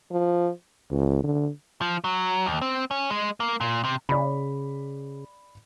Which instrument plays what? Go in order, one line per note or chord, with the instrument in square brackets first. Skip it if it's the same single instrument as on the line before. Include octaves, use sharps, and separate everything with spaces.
[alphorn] F3
[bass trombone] C#2
D3
[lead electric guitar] F3
F#3
D#2
C4
C#4
G#3
A#3
A#2
C3
[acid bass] C#3 [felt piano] D5 B5